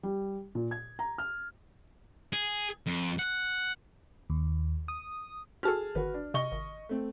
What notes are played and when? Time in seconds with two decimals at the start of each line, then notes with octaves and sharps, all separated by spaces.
0.03 G3
0.55 A#2
0.71 G#6
0.99 A#5
1.18 F6
2.33 G#4
2.86 F2
3.19 F#5
4.30 D#2
4.88 D#6
5.63 E4 F#4 G#4 A4 A5 F6
5.95 G1 D#3 F#4 B4
6.14 D4
6.34 C3 D#5 C#6 G7
6.52 G#1
6.89 A3 C4